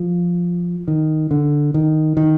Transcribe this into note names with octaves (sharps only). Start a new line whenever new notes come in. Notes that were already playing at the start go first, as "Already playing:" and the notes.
Already playing: F3
D#3
D3
D#3
D#3